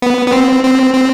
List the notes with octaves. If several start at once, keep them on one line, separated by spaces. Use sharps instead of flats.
B3
B3
C4
C4
C4